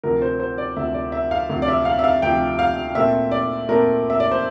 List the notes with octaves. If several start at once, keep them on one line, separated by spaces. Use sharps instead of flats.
D2 C3 F3 A#4
C5
C5
D5
D2 C3 F3 E5
D5
E5
F5
D2 C3 F3
D5
E5
F5
E5
F5
D2 C3 F3 G5
F5
A#2 A3 C4 E5
D5
A#2 A3 C4 A#4
E5
D5
C5